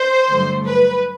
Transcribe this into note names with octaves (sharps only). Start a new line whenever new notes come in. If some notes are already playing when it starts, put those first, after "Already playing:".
Already playing: C5
G2 D3 F#3 A3
B4